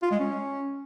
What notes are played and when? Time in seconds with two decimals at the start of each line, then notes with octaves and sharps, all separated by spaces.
0.02 F4
0.11 G#3
0.19 C#4